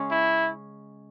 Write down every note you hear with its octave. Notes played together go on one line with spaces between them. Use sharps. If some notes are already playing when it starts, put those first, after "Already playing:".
Already playing: C#3 G#3 C#4
E4